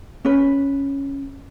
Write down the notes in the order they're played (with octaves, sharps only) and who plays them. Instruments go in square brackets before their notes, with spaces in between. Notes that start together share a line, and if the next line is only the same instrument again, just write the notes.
[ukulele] C#4 B4